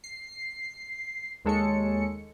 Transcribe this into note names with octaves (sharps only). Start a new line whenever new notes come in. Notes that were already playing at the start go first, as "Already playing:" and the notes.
C7
D#2 G#3 A4 C#5 C#7